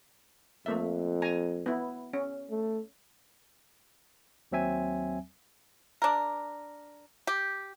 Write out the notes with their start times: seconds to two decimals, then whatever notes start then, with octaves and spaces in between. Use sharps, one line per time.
0.66 F2 A3 A#3 E5
1.22 G#5 A#5
1.66 B3 E4
2.13 C#4
2.50 A3
4.52 D#2 F#3 C4 E5 G#5
6.02 D4 A#4
7.27 G4